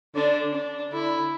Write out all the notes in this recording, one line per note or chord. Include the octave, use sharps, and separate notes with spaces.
D3 D4
D4
D3 E4